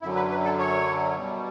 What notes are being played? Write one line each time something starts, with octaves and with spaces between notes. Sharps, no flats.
F#2 D3 F#3 E4
B4
B4
A4
C#5
B2 G3